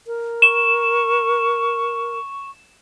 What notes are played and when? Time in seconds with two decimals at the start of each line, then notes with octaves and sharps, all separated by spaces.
0.07 A#4
0.42 C#6 E7